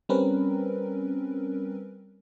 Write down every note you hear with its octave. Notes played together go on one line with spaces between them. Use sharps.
G3 C4 C#4 A#4 B4